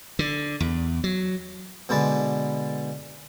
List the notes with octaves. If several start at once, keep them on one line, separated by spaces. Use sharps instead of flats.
D3
E2
F#3
B2 D3 G#3 B4 D5 A5